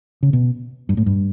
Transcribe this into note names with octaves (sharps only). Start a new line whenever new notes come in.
C#3
B2
G2
A2
G2